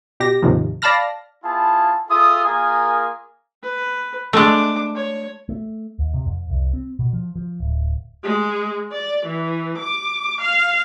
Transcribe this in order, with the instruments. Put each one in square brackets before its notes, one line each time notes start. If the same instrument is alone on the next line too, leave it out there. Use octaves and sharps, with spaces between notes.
[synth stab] B2 G4 A#6
D#2 G#2 C3 D#3 F3
D5 F5 A5 B5 F6 A#6
[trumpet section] B3 E4 F4 G#4 A5
F4 G#4 A4 E5 D#6
A#3 F4 G#4 A#4 G#5 D#6
[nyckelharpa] B4
[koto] G#3 A3 [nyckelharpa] D4 D6
[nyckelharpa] C#5
[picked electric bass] A3
D#2
C3
F2
C2
C4
B2
F3
F3
D1
[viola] G#3
D5
E3
D6
F5